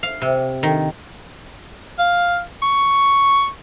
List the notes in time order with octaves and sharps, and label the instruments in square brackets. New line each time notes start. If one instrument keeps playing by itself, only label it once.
[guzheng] F5
C3
D#3
[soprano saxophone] F5
C#6